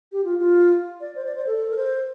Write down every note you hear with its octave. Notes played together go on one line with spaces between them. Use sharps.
G4
F4
F4
D5
C5
D5
C5
A4
A#4
C5